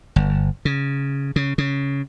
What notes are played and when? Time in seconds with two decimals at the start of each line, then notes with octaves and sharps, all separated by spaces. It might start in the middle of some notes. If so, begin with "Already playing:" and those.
0.16 G1
0.65 C#3
1.36 C#3
1.58 C#3